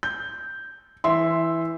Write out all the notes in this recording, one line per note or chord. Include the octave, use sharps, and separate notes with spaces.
G6
E3 E5 C6